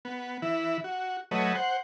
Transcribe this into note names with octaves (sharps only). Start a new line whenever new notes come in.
B3
E3 E4
F#4
F#3 A3 B4 C#5 D#5
C5 F#5